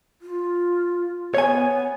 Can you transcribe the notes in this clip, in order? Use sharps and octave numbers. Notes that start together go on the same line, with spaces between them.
F4
B3 C#5 G#5